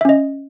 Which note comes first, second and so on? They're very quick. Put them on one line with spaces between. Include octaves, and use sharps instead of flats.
E5 C#4 D#5